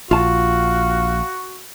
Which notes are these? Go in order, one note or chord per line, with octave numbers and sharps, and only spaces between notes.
A#1 F4 F#4 F5 A5